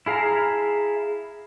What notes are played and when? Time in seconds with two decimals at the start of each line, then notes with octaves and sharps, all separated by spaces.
0.06 E4 G#4 F5 A5 A#5